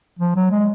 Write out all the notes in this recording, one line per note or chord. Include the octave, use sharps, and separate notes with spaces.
F3
F#3
G#3